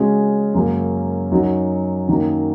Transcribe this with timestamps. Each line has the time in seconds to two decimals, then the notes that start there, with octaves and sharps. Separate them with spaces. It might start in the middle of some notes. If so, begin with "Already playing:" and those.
Already playing: C#3 G#3 C#4 F#4
0.54 F#2 C#3 F#3 A#3
1.32 F#2 F#3 D#4 F#4
2.08 F#2 D#3 F#3 A#3